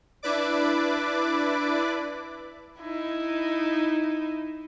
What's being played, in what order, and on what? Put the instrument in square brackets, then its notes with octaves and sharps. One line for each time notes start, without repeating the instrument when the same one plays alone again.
[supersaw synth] D4 E4 B4 D5 D6
[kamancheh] D#4 E4